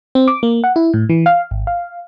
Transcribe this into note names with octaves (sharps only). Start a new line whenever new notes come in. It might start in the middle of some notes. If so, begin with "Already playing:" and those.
C4
D6
A#3
F#5
E4
A2
E3
F5
G#1
F5